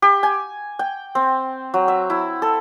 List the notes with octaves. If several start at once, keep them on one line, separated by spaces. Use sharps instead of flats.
G4
G#5
G5
C4
F#3
E5
E4
A4